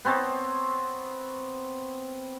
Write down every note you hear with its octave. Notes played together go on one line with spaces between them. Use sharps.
B3 C4 C#5 A5